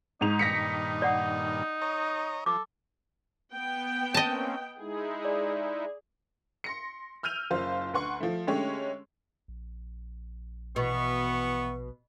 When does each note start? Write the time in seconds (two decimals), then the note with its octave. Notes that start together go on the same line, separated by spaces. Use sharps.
0.21 G#2 D#4 F7
0.39 G2 A#2 D#3 A#6 B6 C#7
1.02 D5 F#5 D#6
1.82 C#5 D#5 A#5
2.46 F3 A4 D6
3.54 B3 G5
4.14 A#3 C4 C#4 D#5 A5
4.79 G#3 D#4 E4 G#4
5.25 D5
6.64 C6 A#6 C#7
7.23 E6 F6 G6 D#7 F7
7.51 F#1 F4 C5 F5
7.93 D2 B4 F#5 C6 C#6
8.20 F3 A3
8.47 D3 G#3 A3 C#4 G4 C#5
9.48 A#1
10.76 B2 E3 B3 C#6